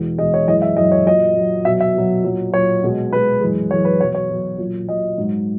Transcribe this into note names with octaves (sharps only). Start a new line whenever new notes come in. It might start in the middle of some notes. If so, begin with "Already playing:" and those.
Already playing: E2 B2 G#3
E2 B2 G#3 D#5
C#5
F#2 E3 G#3 D#5
E5
F#2 E3 G#3 D#5
C#5
A#2 F#3 D#5
A#2 F#3
B2 F#3 E5
E5
B2 F#3
A#2 F#3
A#2 F#3 C#5
B2 G#3
B2 G#3 B4
F#2 E3 G#3
F#2 E3 G#3 C#5
B4
B2 F#3 C#5
C#5
B2 F#3
A#2 F#3
A#2 F#3 D#5
G#2 F#3